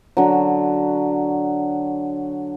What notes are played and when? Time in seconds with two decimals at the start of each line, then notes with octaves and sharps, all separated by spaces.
0.17 D3 F#3